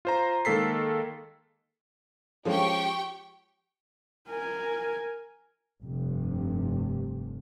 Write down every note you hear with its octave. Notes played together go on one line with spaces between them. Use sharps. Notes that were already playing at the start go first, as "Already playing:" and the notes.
F4 C5 A#5
D#3 G#3 A#3 A4 B6 C7
F3 G#3 C#4 G4 G5 C#6
A#4 G#5
F1 G2 C3